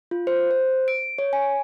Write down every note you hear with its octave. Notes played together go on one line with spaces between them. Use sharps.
F4
C5
C5
D7
C#5
G#5